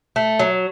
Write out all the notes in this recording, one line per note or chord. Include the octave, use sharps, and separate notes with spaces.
A3
F#3